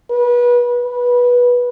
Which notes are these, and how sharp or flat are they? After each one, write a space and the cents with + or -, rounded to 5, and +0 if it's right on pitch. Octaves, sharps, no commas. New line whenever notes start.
B4 -25
B4 -15